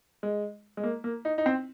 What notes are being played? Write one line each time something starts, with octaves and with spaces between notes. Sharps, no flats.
G#3
G#3
A#3
A#3
D#4
D#4
C4